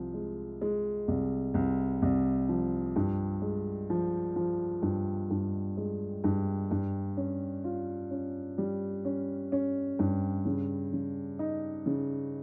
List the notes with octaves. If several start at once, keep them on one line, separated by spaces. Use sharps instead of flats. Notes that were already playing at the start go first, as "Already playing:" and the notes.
Already playing: C2 F3
G#3
G#3
C2
C2
C2
F3
G2
G#3
F3
F3
G2
G2
G#3
G2
G2
C#4
F4
C#4
G3
C#4
C#4
G2
C#3
C#3
D#4
C#3